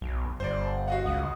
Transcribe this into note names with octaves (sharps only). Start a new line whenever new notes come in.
B1
G1 C5 D5
F#4 D#5 F5 F#5
C#2 D#6